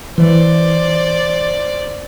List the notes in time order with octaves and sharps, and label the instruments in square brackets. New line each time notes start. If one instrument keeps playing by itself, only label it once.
[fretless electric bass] E3 [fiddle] C5 D5